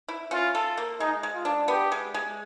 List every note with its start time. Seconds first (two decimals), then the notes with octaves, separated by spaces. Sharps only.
0.09 E4
0.31 C#4 F4
0.55 A4
0.78 A#3
1.00 G#3 D#4
1.23 G#3
1.34 F4
1.45 D4
1.68 B3 G4
1.92 G#3
2.14 G#3